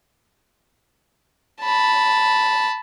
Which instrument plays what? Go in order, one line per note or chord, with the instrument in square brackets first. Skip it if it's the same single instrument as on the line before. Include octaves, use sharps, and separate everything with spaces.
[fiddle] A5 B5